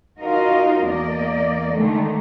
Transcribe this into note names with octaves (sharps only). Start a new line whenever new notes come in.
D#4 F4 F#4 A#4 D#5 F5
E2 A#3 D5 D#5
D3 D#3 G#3 A3